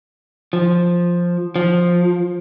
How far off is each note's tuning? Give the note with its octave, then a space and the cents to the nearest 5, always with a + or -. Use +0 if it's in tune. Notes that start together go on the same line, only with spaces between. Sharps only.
F3 +5
F3 +10